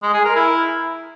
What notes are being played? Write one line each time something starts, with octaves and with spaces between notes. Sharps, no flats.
G#3
G#4
A#4
E4